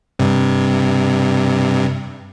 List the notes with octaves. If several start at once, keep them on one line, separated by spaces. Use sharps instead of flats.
G2 C3